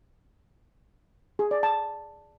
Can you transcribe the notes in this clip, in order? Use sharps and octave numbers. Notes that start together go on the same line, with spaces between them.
G#4
D5
A5